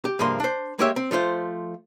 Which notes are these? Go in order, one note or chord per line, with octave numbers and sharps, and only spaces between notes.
G4
C2 G2 F3 A#3 G#4 C6
D4 C5
G#3 A#3 G4 C#5 E5
C4
F3 A3 F4 C5